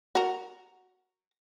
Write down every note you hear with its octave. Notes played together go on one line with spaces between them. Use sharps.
F#4 A#4